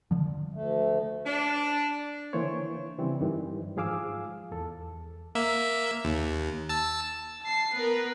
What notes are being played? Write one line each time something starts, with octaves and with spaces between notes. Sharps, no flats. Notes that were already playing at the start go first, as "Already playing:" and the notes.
D3 F3
D2 A3
D4
D3 E3 A#3 C5 C#5
C#3 E3 G3 C4
G2 D#3 E3 G3
G#2 F3 G#4 F5 D6 E6
E2 A4
A#3 E5
D#2
A5 E6
A5 C7
B3 A#4 B4